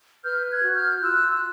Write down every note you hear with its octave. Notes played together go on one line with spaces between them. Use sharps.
B4 F6 G6
F#6 G#6
F#4
F6 G6
F4 E6 F#6
F#6